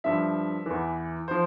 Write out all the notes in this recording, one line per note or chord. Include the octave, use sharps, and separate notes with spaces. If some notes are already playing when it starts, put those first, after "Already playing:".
G2 F3 E5
E2 E3
F3 C5